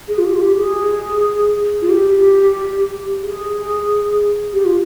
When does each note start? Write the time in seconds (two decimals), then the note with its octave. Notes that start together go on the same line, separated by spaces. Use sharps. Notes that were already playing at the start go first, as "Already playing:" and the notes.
0.08 G#4
0.18 F4
0.25 G4
0.35 F4
0.41 G4
0.58 G#4
1.82 F4
1.89 G4
3.21 G#4
4.53 G4
4.65 F4